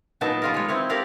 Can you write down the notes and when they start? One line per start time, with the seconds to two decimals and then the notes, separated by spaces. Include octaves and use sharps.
0.21 A#2 F#3 B3 D#4 A5
0.42 G3 F4 A#4
0.54 G#3 C#5
0.68 C4 E4 C#5
0.89 G4 A#4 D5 F5